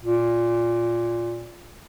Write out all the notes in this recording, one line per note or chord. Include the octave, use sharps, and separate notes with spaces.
A#2